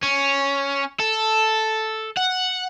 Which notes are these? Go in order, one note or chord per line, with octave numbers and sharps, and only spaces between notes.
C#4
A4
F#5